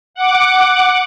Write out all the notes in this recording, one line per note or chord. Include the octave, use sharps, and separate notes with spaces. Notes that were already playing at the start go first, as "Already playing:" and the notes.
F#5 D6